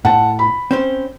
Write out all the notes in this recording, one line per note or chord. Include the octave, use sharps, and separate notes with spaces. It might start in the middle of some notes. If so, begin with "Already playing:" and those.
A2 F#5 A5
B5
C4 C#4 C5